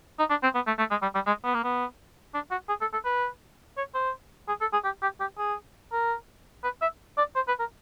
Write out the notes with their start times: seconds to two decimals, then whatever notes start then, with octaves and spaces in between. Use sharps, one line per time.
0.19 D#4
0.30 D4
0.43 C4
0.55 B3
0.67 A3
0.79 A3
0.91 G#3
1.02 G3
1.15 G3
1.27 G#3
1.44 B3
1.54 A#3
1.64 B3
2.34 D4
2.51 F#4
2.69 G#4
2.81 A4
2.93 A4
3.05 B4
3.78 C#5
3.94 C5
4.48 G#4
4.61 A4
4.73 G#4
4.84 G4
5.02 G4
5.20 G4
5.38 G#4
5.92 A#4
6.64 B4
6.82 E5
7.18 D5
7.35 C5
7.48 B4
7.60 A#4